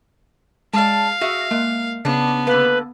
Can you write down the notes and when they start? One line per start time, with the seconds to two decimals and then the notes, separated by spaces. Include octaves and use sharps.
0.73 G#3 D5 F5 A5
1.21 F#4 G#4 E5 A#6
1.51 G#3 A#3
2.05 C#3 B3 D4
2.47 D3 A#3 B4